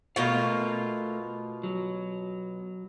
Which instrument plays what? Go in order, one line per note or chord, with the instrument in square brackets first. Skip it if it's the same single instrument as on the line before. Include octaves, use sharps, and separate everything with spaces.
[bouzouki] B2 F4 [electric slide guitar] A3 A#4 F5
[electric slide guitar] F#3